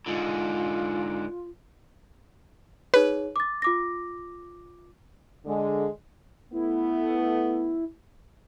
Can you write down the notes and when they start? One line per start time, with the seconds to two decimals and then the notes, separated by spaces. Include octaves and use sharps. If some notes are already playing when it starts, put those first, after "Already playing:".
0.06 G#2 D3 F4
2.94 D#4 G#4 B4 C#5
3.36 D6 A6
3.62 F4 D6 A#6
5.46 D3 G#3
6.52 A3 B3 E4